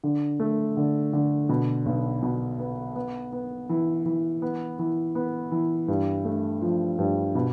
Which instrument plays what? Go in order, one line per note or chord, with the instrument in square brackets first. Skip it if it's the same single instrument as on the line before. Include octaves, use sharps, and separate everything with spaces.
[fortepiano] D3
A3
D3
D3
B2
B1
B2
B3
B3
B3
E3
E3
B3
E3
B3
E3
G2
A3
F3
G2
B2